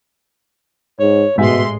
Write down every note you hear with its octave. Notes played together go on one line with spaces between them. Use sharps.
G#2 C#5
A1 G#2 B2 G#3 E5 C6